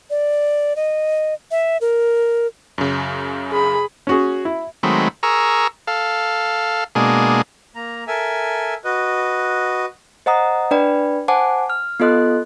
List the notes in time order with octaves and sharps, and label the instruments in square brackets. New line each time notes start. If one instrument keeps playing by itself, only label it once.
[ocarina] D5
D#5
E5
A#4
[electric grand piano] F#2 C#3
[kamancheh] G#4 B5
[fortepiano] C#4 F#4 G#4
E4
[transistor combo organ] D#3 F#3 G#3 A3 C4 B5
G#4 A#4 A#5 C#6 E6
A4 F5
B2 G#3 A#3 D4 G#4
[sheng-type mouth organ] A#3 A#5
A4 A#4 E5 G#5
F#4 B4 D#5
[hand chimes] C5 D#5 F#5 A#5 D#6
D4 B4 D5 G5 B5
C5 F#5 G#5 A5 D6
F6
B3 F4 A4 D#5 C6 F#6